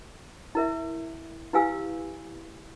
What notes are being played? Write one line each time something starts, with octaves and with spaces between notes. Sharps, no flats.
E4 A#4 E5
E4 G4 B4 F5 G#5 E6